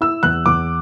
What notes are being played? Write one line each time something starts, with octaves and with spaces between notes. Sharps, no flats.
E4 E6
E2 F#6
E2 D6